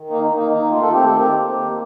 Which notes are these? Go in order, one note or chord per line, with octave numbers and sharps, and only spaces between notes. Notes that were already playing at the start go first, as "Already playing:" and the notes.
Already playing: D#3
A#3 D#4
D#4
A#3
D#4
D#3 D#4
A3 F4
A4
C4 G4
A4
D#3
G4
A#3
A#3